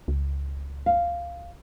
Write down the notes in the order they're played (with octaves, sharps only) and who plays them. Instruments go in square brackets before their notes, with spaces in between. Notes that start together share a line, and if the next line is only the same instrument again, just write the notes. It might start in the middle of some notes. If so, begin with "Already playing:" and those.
[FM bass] C#2
[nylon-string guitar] F5